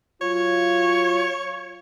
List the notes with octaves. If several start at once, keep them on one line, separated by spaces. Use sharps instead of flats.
F#3 F4 C#5